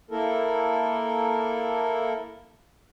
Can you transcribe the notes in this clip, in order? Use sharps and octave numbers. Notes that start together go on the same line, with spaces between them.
A#3 E4 A4 A#4